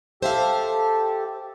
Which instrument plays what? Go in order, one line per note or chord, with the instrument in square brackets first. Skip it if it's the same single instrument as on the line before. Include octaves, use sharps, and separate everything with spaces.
[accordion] G4 A4 [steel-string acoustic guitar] C5 E5 F5